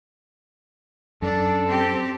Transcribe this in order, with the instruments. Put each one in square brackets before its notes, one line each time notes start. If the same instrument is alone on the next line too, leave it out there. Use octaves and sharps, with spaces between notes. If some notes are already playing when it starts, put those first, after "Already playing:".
[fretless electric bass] F#2 [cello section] D4 [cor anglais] A4
[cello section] C4 G4